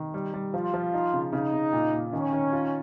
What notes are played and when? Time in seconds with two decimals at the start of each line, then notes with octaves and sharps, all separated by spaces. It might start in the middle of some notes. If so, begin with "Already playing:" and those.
Already playing: D#3
0.14 G3
0.34 G3
0.53 F3 F4
0.74 F3
0.94 D#4
1.13 C#3
1.33 C#3 D#4
1.53 C#3
1.73 A#2
1.93 A#2
2.13 D#3 C#4
2.33 D#3
2.53 F4